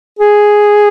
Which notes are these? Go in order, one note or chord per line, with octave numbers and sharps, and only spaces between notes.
G#4